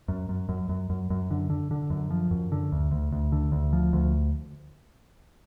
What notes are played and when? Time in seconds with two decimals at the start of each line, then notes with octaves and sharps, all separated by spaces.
0.08 F#2
0.29 F#2
0.49 F#2
0.69 F#2
0.90 F#2
1.10 F#2
1.31 D3
1.50 D3
1.71 D3
1.90 F#2
2.10 F3
2.31 F#2
2.52 D3
2.72 D2
2.92 D2
3.12 D2
3.32 D3
3.52 D2
3.73 F3
3.93 D2